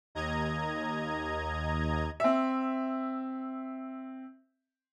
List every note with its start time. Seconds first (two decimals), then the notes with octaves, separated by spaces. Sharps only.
0.15 D#2 D#5 A#5 G#6
2.20 C4 E5